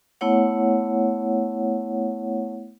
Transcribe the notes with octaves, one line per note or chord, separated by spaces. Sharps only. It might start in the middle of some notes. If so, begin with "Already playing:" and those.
A3 B3 E4 C#5 F#5